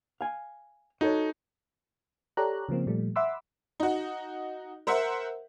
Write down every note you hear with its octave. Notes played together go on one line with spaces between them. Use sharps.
F5 G#5
D#4 F#4 A4 C#5
G4 A4 C#5 D5 A#5 F#6
C#3 F3 A#3 C4
A#2 F3 G3 A3
E5 F#5 B5 C6 D6 E6
D#4 F#4
A#4 C5 E5 F#5